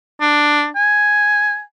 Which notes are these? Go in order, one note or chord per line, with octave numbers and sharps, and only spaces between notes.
D4
G#5